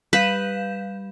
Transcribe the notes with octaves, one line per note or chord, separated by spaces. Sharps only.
G3 B4 F5 G6 E7